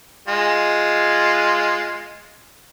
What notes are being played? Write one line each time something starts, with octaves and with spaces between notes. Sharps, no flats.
G#3 F4